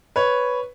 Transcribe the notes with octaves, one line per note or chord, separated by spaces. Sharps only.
B4 C#5